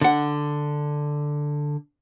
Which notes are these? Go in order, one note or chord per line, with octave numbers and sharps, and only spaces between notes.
D3 F#5